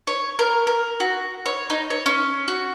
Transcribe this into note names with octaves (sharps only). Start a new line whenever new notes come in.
C#5
A#4
A#4
F#4
C#5
D#4
C#5
C#4
F#4